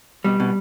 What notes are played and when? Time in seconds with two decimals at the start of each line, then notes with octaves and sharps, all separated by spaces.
0.24 B2 G3
0.40 B2